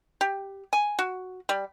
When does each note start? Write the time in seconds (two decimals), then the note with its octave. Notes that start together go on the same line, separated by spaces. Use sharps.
0.21 G4
0.73 G#5
0.99 F#4
1.49 G3